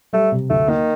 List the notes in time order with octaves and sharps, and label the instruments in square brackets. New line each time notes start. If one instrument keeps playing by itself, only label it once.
[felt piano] G3 [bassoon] A3
[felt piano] C3
[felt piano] D2 [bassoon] A3
[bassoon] D#3 [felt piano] A#3